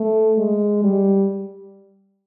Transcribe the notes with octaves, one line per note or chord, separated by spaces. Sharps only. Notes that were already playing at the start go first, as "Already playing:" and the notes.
Already playing: A3
G#3
G3